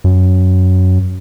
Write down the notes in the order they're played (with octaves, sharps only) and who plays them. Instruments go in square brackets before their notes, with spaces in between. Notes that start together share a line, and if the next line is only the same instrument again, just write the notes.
[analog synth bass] F#2